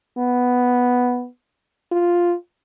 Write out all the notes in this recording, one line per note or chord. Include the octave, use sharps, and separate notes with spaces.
B3
F4